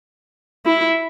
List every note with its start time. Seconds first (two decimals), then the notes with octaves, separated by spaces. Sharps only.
0.65 E4